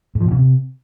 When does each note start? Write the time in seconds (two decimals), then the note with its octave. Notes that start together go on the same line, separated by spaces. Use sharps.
0.15 G#2
0.20 F3
0.26 A#2
0.31 C#3
0.37 C3